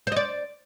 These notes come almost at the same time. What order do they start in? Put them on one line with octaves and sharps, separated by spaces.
C5 D#5 D5